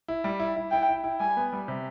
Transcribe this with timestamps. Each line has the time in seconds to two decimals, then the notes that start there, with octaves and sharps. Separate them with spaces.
0.08 E4
0.24 G3
0.40 E4
0.56 E4
0.71 E4 G5
0.89 E4
1.04 E4
1.20 G3 G#5
1.37 B3
1.53 G3
1.68 C3